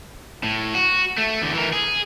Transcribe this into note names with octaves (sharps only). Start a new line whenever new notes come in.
A2
F#4
A3
E2 D3
E3 A#4
G#4